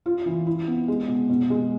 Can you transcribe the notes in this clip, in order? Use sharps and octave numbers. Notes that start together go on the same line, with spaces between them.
F4
E3
E4
B3
G#3
B2
B2
G#3